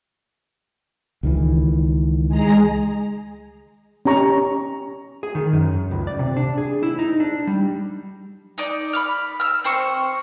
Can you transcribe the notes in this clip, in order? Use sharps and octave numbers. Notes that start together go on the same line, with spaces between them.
C#2 D#3 E3
G#3 G#4 A#5
C#4 G4 A#5 C#6
G#4
D#3
F#2
C#2
D5
C3
D4
G#4
E4
D#4
D4
G3
D#4 D5
B5 D6 F6
E6 F6
C4 C5 C#6